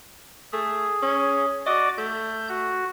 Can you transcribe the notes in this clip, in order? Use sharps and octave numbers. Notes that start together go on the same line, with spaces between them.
A3 G#4
C#4
F#4 D5 D#5 D6
A3 G6
F#4